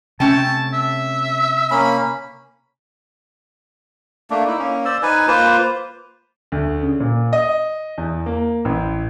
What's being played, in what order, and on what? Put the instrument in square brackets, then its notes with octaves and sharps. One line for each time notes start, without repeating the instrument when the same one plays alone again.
[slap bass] C3 [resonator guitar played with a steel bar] A3 C#4 G5 [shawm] A5
[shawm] E5
[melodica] A#3 C#4 B5
A3 A#3 D4
D#4 E4
A#3 C#4
C5 D5 E6
D#4 B4 G#5
A#3 F4 B4 C5
[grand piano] D2
C#3
A#2
D#5
E2
A#3
A1